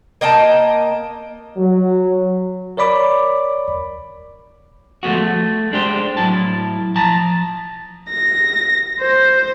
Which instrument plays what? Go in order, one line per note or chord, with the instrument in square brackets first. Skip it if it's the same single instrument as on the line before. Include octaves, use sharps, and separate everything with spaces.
[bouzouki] A#3 D#5 G5 A5
[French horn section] F#3
[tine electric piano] A#4 C#5 D5 B5 D6
[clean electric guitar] F3 G#3 A3 B3 F#4
A3
G#3 D4 G4 C5
A2 F#3 E4 A5
F3 A5 A#5
[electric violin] A#6
C5